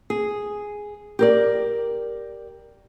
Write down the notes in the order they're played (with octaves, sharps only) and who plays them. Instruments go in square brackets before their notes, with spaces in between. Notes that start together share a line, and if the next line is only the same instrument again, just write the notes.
[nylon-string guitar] G#4
G4 A#4 D5